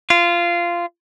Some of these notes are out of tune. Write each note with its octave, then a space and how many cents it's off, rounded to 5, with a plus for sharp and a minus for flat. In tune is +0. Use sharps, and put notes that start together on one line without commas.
F4 -15